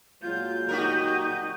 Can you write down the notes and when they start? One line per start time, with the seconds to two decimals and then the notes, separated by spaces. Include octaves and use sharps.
0.22 A#2 F#3 G#3 F4 G6
0.69 D#4 F#4 G4 A#4 D#5